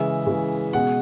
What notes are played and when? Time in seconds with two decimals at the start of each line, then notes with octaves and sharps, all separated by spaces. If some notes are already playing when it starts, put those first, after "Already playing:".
Already playing: C#3 E3 G#3 E5
0.27 C#3 E3 G#3
0.73 B2 G#3 F#5